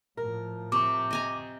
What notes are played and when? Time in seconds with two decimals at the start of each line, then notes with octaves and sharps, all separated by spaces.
0.17 A2 F3 A#4
0.72 C3 C#6 D6
1.11 D#5 G#5 A#5